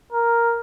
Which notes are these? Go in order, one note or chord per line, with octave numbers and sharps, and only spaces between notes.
A#4